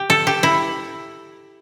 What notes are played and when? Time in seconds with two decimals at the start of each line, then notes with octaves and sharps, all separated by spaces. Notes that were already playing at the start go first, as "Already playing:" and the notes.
Already playing: G4
0.10 A4
0.27 G4
0.43 E4